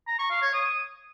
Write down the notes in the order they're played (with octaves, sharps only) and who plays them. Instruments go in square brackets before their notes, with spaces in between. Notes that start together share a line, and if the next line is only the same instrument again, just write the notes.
[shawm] A#5
C#6
F5
C#5
D#6